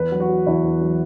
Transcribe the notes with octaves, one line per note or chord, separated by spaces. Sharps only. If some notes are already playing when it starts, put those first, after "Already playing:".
Already playing: E2 B4
F#3
F#4
F#3
E2 E4
E2
F#3